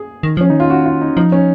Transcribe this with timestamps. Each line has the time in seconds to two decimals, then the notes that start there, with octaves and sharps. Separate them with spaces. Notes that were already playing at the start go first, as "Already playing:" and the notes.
Already playing: G#4
0.23 D#3
0.37 F3 C#4
0.50 D#3 D#4
0.60 F4
0.70 F#4
0.86 F4
1.01 D#4
1.17 F3 D#4
1.32 C#4